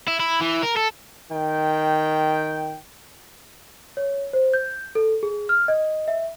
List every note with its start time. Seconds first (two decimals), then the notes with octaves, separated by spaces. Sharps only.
0.08 E4
0.20 E4
0.41 E3
0.63 A#4
0.77 A4
1.32 D#3 G5
3.97 C#5
4.33 C5
4.54 G6
4.95 A4
5.23 G#4
5.49 F6
5.68 D#5
6.08 E5